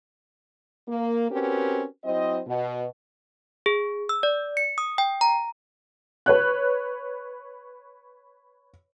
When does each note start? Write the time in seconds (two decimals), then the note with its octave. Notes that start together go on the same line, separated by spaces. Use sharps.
0.88 A#3
1.31 C4 C#4 F#4 G4 A#4 B4
2.04 F#3 C4 E4 C5 D#5
2.47 B2
3.66 G#4
4.09 E6
4.23 D5
4.57 C#7
4.78 D#6
4.98 G5
5.21 A#5
6.26 B4 C#5 F#6